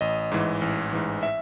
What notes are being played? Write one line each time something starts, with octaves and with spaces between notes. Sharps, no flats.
A1 D#5
G#2 E3
A1
G#2 E3
E5